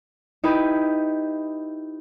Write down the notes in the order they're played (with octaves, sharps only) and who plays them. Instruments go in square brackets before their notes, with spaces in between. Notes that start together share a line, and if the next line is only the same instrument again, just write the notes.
[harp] D#4 E4 G4 B4